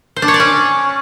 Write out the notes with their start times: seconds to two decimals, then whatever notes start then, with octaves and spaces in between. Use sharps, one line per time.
0.16 C5
0.22 D4
0.28 C#5
0.34 D5
0.40 C#4